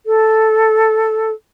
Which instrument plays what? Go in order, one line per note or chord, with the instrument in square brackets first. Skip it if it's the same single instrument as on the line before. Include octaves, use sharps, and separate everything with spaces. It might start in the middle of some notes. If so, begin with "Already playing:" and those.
[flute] A4